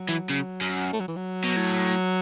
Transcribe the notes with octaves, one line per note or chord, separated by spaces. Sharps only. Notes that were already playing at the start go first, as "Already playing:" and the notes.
Already playing: F#3
E3
C#3
F#2
A3
F#3
E3
F#3
B2
A2